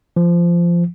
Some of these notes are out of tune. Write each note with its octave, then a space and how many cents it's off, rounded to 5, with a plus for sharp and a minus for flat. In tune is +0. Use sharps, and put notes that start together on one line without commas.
F3 -20